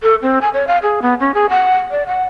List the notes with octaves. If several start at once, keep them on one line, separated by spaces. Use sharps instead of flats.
A4
C4
G#5
C#5
F5
G#4
B3
C#4
G#4
F#5
D5
F#5